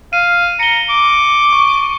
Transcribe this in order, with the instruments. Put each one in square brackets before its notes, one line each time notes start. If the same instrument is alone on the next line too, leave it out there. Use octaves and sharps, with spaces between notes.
[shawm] F5 [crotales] D#7
[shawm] A#5 [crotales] C#7 G7
[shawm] D6
[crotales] C#6